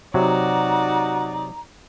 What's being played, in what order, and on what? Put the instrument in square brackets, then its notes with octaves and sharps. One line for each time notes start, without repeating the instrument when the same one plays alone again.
[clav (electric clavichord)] C3 F#3 [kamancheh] D#4 D5 [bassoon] F#4 [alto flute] A#5